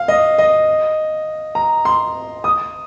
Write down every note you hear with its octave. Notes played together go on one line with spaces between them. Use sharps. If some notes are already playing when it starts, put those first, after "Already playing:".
Already playing: F5
D#5
D#5
A#5
C6
D#6